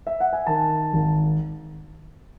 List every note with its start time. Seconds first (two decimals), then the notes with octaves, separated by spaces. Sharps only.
0.07 E5
0.20 F#5
0.33 G#5
0.47 D#3 A5
0.93 G#1